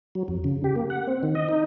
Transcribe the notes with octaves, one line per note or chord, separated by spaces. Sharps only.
F#3
F2
C#3
G4
A#3
F#5
C4
D#3
D#5
D#4